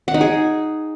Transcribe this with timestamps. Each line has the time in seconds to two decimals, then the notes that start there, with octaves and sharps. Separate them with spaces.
0.08 F#5
0.14 D#4
0.21 G#4